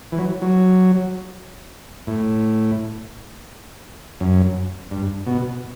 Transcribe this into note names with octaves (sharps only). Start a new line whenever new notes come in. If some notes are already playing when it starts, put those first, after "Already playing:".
E3
F#3
F#3
A2
F#2
G2
B2